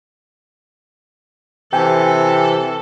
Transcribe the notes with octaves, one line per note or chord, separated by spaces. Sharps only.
C3 E3 A4 G5 G#5